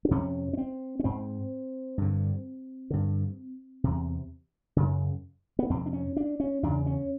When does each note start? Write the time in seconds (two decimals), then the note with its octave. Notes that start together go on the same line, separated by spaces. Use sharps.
0.05 D4
0.11 F2 C3 C#4
0.53 C#4
0.58 C4
1.00 C#4
1.04 G#2 C4
1.98 G2 D3
2.90 G2 D3
3.84 E2 C3
4.76 F#2 C#3
5.59 B3
5.70 F2 C3 C4
5.86 D4
5.93 C#4
6.17 D4
6.40 C#4
6.63 E2 C#3 D4
6.86 C#4